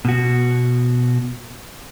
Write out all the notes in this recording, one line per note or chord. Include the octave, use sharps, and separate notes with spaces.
B2 F#4